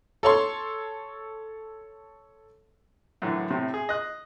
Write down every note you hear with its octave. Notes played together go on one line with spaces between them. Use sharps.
A4 C#5 C6
F#2 A2 D3 E3
A2 C3
G#4
D#5 F#6